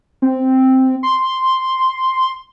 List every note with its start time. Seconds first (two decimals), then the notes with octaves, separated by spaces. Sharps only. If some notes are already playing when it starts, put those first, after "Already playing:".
0.22 C4
1.03 C6